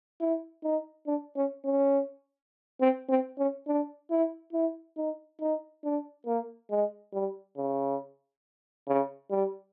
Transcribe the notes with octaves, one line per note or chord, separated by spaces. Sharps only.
E4
D#4
D4
C#4
C#4
C4
C4
C#4
D4
E4
E4
D#4
D#4
D4
A#3
G#3
G3
C#3
C#3
G3